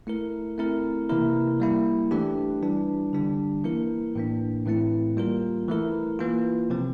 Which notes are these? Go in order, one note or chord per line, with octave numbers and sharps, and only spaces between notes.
A3 E4 A#4
A3 C4 E4 A#4
C3 E3 A#3 E4 A#4
G3 A#3 E4
E3 A3 D4 G4
E3 G3 D4
D3 G3 D4
E3 A#3 E4 A#4
A2 E3 A#3 D4
A2 E3 A3 C4 E4
G3 A#3 F4 A#4
E3 A3 E4 A#4
E3 A#3 F4
C3 F3 C4